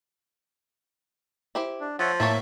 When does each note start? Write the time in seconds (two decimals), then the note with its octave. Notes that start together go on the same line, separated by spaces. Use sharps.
1.55 E4 G4 C5
1.80 D4
1.99 F3 A4 C#5 E5 F#5
2.20 A2 F#3 A#3 C4 C#5 E5 A5